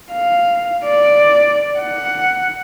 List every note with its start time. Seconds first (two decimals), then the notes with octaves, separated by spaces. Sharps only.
0.13 F5
0.85 D5
1.80 F#5